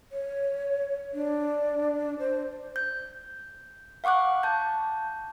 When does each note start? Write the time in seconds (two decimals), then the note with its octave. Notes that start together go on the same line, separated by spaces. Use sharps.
0.12 C#5
1.14 D4
2.19 C5
2.76 G6
4.04 F5 F#5 C#6 D6 F#6
4.43 A5 G6